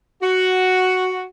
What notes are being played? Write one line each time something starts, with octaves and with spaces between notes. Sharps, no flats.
F#4